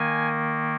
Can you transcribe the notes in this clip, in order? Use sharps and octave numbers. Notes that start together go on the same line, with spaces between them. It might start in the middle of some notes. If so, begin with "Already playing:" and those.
Already playing: D#3 A#3 G#5